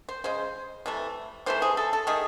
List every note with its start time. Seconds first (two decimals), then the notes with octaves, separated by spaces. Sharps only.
0.09 C5
0.24 C#3 G#3 C5
0.86 C3 E3 A3
1.46 C3 E3 A3 C5
1.62 G#4
1.77 A4
1.93 A4
2.07 D#3 A3 G#4